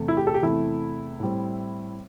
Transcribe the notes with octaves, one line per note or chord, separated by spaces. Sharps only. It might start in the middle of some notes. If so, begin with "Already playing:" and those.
Already playing: E2 C3 A3
E4
G4
A4
G4
E2 C3 A3 E4
A2 G3 C4